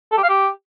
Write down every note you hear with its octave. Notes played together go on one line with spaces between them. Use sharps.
A4
G4
F5
G4